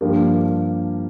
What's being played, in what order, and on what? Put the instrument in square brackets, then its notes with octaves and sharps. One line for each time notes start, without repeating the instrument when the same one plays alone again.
[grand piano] G2 F3 A#3 D4 G4 A#4